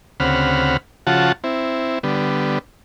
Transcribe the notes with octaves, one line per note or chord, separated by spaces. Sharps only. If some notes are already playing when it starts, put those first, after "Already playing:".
D2 C#3 C4 F#5 B5 F6
C#3 F3 F4 F#4 F#5 A5
C4 E4
D3 G3 B3